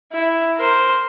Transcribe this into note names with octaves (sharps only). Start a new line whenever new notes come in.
E4
A#4 C5